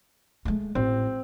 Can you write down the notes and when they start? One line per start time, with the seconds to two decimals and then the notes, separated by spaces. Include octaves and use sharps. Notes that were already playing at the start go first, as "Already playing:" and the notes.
0.45 G#3 A3
0.75 A1 C4